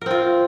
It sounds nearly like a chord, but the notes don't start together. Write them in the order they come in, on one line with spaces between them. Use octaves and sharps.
A#4 C4 F4